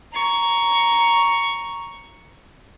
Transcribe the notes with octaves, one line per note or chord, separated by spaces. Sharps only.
A#5 C#6